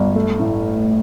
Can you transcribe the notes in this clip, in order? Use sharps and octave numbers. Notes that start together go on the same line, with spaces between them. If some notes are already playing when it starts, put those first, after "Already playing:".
Already playing: G1
A3
A2